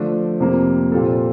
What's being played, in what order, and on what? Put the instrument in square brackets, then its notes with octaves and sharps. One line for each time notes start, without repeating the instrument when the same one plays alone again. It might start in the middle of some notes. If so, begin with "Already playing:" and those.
Already playing: [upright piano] D3 F3 A3 D4
F2 C3 F3 A#3
A#2 G3 C4 F4 A4